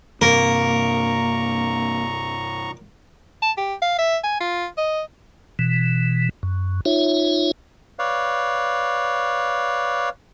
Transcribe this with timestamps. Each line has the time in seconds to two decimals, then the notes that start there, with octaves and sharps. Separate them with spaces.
0.21 G2 C3 A#3 C4 A#4 A#5 C#6
3.42 A5
3.57 G4
3.82 F5
3.99 E5
4.24 G#5
4.41 F4
4.78 D#5
5.59 B2 E3
6.43 F#2
6.85 D#4 F4 C#5 E5
7.99 B4 C#5 D5 F5